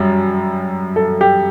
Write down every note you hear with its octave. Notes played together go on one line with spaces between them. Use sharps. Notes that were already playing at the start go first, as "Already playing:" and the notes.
Already playing: F#2 G3
A4
G4